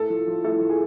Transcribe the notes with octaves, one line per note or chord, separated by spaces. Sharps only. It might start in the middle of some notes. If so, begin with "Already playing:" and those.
Already playing: A2 A4
F3
F3
A2 A4
F3
G#4